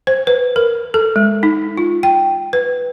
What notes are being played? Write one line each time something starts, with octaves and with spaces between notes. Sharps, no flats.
C5
B4
A#4
A4
G#3
D#4
F4
G5
B4